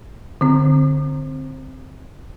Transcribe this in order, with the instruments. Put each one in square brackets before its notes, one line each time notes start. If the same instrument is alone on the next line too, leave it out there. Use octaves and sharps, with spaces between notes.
[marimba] D3 C4